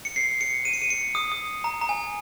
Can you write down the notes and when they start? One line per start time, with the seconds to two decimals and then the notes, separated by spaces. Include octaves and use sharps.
0.05 C#7
0.16 C7
0.41 C#7
0.65 D#7
0.73 C#7
0.82 D#7
0.90 C#7
1.15 D#6
1.32 D#6
1.64 A#5
1.81 A#5
1.89 G#5